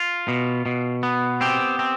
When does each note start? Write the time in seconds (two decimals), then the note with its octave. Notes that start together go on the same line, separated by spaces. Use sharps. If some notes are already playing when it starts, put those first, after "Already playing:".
Already playing: F4
0.28 B2
0.66 B2
1.03 B3
1.41 C4 G4
1.79 C4